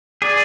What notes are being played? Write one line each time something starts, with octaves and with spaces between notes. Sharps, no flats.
G#4 D5